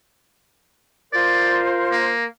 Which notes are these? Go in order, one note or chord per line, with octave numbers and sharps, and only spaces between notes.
F4 A#4 C5 D5
A#3